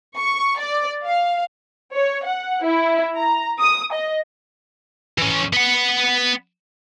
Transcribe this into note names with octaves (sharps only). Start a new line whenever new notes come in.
C#6
D5
F5
C#5
F#5
E4
A#5
D#6
D#5
E3 C#4
B3 F#5